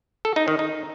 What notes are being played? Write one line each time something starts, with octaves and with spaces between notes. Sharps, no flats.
A4
D#4
D#3
D#4